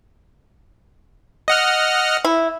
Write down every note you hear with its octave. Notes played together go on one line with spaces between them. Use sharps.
D#5 F#5 F6
E4